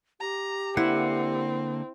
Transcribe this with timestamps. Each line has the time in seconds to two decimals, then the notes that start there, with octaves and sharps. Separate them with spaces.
0.20 G4 A#5
0.77 D3 A#3 C4 E4 F#5